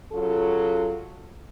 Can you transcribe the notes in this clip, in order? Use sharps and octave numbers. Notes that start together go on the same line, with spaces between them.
C#3 F#3 F4 A4